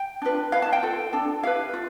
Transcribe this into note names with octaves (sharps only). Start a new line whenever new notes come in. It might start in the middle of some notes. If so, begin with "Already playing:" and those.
Already playing: G5
D4 F4 B4
E4 B4 F5
A5
G5
F4 A4
D4 A4
E4 G4 B4 F5
F4